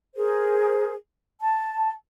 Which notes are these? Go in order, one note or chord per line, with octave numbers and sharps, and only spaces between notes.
G#4 A#4 C5
A5